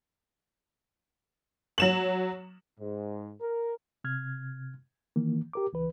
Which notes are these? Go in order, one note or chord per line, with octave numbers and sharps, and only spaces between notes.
F#3 E7 F#7
G#2
A#4
C3 F6 G#6
D#3 E3 A#3
G4 A#4 D6
C#2 E3 B4